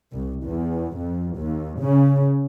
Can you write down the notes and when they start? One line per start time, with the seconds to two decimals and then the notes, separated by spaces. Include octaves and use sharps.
0.13 C2
0.45 E2
0.96 F2
1.36 D#2
1.80 C#3